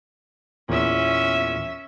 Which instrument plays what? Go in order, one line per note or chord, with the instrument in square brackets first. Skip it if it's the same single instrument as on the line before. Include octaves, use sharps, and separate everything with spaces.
[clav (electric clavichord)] E2 A#2 [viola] C#4 E5